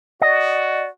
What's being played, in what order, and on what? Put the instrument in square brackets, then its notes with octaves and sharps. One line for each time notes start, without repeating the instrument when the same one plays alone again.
[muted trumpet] F#4 [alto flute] D5 [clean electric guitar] D#5